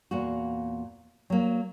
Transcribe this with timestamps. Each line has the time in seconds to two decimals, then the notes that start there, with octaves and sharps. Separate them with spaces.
0.11 E2 A#2 A#3 F#4
1.30 F#3 A#3